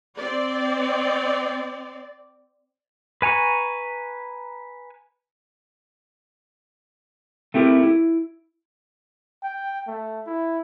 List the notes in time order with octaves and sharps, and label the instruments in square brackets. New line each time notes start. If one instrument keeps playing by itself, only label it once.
[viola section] C4 D5
[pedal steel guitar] B4 G#5 A#5 C#6
[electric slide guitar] A3 C4 E4 G4 A#4
E4
[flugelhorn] G5
A3
E4